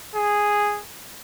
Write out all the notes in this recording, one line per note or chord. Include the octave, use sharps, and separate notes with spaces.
G#4